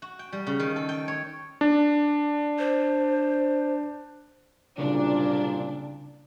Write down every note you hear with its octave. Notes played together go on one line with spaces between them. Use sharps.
F#4
G5
G3
C#3
D#3
A4
G5
C#5
D4
C5
F#1 C2 A#2 C#3 D4